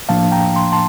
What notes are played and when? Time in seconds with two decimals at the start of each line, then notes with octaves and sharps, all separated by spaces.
0.09 A2 F3 A#3 D4 F5 A5
0.32 G5 A#5
0.56 C6
0.72 A5 C6